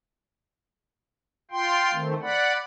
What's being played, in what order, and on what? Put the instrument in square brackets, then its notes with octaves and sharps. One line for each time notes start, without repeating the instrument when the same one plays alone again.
[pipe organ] F4 G5 C6
D#3 A3 C4
D5 F#5 B5